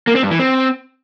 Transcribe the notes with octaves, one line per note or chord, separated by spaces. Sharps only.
A#3
C4
G2
E3
C4